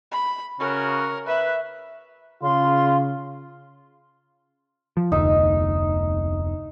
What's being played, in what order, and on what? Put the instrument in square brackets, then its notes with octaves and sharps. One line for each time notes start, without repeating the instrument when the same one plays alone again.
[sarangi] B5
[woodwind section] C#3 C#4 F#4 [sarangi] A#4
[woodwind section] B4 [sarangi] E5
[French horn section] C#3 [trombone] F4 [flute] C6
[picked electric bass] F3
[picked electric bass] F1 D2 [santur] D#4 E5